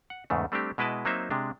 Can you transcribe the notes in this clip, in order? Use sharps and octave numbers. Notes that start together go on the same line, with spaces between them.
F#5
E2 G#2 C#3 A3
G3 A3 C4 D4 G4
B2 G#3 E4 B4 D#5 A5
F#3 A#3 C4 D#4 C5 E5
C3 G#3 D4